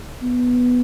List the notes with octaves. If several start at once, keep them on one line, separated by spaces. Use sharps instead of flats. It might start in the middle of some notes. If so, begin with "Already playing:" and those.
B3